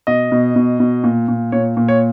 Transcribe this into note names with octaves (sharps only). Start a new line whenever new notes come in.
B2 D#5
B2
B2
B2
A#2
A#2
A#2 C#5
A#2
C#5